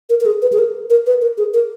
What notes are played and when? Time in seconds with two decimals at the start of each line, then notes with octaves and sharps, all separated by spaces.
0.10 A#4
0.21 A#4
0.26 G#4
0.42 B4
0.53 G#4
0.58 A#4
0.90 A#4
1.06 B4
1.22 A#4
1.38 G#4
1.54 A#4